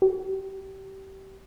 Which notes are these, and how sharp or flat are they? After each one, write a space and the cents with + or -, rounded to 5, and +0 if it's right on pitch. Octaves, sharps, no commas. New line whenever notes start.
G4 -25